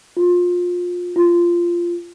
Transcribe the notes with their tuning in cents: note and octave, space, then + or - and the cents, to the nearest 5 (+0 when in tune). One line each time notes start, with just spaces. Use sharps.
F4 +25
F4 -15